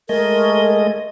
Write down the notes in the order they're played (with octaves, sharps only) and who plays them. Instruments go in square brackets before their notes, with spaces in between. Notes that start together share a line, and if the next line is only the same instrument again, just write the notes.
[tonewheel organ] G#3 A3 D#5 [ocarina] A#4